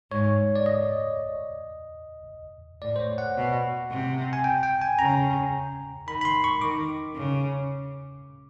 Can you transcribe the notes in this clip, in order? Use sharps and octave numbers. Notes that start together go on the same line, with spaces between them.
G#2 C#5
D5
D#5
A2 D5
C5
C#5
F#5
B2
C3
G#5
G5
G5
G#5
C#3 A#5
D#3 B5
B5
C6
C#6
D#3 D6
C#3